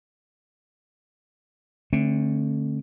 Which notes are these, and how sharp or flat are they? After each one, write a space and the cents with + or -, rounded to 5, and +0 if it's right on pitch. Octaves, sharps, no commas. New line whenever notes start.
D3 +0 A3 +0 C4 +40